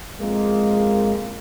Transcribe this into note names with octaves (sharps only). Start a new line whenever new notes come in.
F2 G#3 A#3